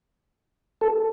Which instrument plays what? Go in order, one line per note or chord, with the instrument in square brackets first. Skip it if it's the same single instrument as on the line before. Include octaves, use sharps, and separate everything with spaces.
[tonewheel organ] A4